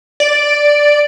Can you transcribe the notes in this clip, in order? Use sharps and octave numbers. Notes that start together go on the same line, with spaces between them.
D5